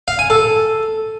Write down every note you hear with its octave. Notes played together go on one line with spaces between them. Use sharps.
F5
G#5
A4